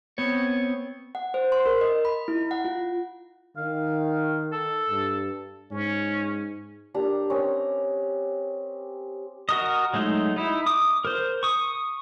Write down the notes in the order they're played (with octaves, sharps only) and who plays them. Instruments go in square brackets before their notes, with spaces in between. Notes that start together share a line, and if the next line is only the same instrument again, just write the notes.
[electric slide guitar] B3 C4 C#5
[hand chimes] F#5
C5
C6
A#4
D#5
B5
E4
F#5
F4
[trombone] D#3 [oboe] F5
[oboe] A4
[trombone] G2
[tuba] G#2 [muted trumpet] C#4
[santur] D4 G4 A#4 A#5
C4 C#4 A#4 D#5
[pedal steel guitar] F#4 A#4 D#5
F#3 G#3 A3 D#4
D#4 E4
D6 D#6
A#4 C5
C#6 D#6